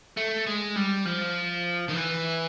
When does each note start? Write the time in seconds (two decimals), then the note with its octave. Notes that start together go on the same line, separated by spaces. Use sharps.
0.17 A3
0.47 G#3
0.76 G3
1.05 F3
1.89 D#3
1.94 E3